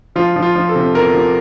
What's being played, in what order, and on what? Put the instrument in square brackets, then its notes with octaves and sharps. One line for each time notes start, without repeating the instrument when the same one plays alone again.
[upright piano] F3 [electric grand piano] F4
[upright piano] F3
[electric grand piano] F4
[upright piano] F3
[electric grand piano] A4
[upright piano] C3
[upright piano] E2 [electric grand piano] A#4
[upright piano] F3